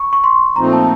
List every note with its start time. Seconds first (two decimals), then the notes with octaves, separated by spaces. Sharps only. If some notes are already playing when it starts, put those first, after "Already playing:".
Already playing: B5 C#6
0.13 C#6
0.24 C6
0.56 A#2 F3 A3 C4 D#4 A#5
0.73 A5